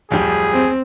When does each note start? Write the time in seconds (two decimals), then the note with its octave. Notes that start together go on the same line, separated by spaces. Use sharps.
0.11 D1 F2 G3 G#4
0.53 C4